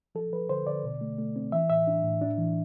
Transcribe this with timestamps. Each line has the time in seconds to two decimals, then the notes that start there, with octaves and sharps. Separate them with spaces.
0.15 F3 A4
0.33 F3 B4
0.49 D3 C5
0.67 D3 D5
0.84 B2
1.01 A3
1.19 A3
1.36 C4
1.52 E3 E5
1.70 A2 E5
1.87 D4
2.04 A2
2.22 D4
2.38 E3